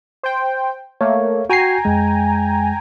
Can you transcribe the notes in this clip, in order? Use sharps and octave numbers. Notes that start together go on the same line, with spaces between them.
C5 G5
A3 A#3 C#5
F#4 G5 G#5 A#5 C7
F2 G#3